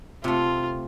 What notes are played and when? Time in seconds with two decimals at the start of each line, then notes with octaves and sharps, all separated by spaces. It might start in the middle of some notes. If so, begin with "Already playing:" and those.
0.24 C3 A3 F4